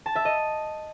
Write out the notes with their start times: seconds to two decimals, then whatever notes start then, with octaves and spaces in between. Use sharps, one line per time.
0.06 A5
0.15 E5
0.25 D#5